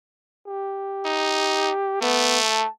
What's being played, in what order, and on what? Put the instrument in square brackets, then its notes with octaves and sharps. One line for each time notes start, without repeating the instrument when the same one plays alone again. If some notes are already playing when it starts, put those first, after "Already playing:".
[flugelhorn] G4
[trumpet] D#4
[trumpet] A3 [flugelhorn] B3
[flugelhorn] A5